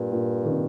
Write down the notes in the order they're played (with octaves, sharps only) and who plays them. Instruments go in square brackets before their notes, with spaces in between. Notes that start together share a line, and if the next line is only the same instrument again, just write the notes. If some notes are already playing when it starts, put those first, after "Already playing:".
Already playing: [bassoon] G2 [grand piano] A#2
[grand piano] A#2
D#3
C3